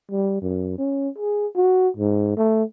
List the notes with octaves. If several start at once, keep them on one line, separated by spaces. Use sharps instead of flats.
G3
F#2
C#4
G#4
F#4
G#2
A3